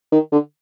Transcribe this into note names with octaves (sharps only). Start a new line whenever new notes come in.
D#3
D3